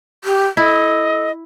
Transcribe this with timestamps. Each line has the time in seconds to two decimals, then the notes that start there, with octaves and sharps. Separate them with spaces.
0.24 G4
0.57 E4 A4 D#5